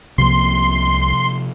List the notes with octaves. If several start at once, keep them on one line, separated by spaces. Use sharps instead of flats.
C2 C3 F3 A#3 C6